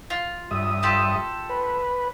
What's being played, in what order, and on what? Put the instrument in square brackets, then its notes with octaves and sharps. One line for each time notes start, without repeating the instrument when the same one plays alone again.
[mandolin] F4
[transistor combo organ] G2 E5 D#6
[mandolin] F4 G4 A4
[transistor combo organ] B4